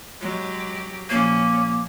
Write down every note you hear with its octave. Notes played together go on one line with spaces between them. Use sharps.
F#3 G#3 G4
A#2 F3 A#3 C#4